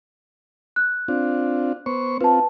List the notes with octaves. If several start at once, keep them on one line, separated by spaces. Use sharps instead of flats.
F#6
C4 D4 F4
B3 C5 C#6
C4 F4 B4 A5